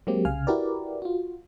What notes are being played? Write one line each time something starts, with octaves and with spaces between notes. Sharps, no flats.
F#3 G#3 A#3 C4 G4
C2 C#3 F5 G#5 F6
E4 F#4 G4 A#4 B4 D5
F4 F#4